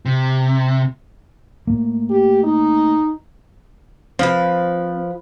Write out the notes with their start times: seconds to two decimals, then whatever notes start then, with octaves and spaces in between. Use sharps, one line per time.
0.05 C3
1.67 A2 A#3
2.10 G4
2.43 D#4
4.19 F3 C4 B4